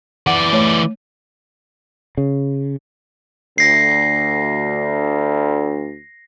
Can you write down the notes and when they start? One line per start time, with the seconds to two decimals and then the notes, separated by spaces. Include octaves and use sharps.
0.27 E3 D5 F#5
0.53 A3 C#5
2.17 C#3
3.58 D2 A#6 C7